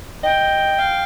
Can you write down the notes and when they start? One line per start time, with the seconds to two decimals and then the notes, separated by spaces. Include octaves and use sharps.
0.23 D#5 G5
0.79 F5